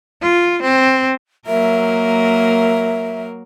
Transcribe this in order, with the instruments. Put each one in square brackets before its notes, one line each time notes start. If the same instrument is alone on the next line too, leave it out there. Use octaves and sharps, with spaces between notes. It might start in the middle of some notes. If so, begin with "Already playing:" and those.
[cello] F4
C4
[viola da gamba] F#3 A#3 A#4 [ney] E5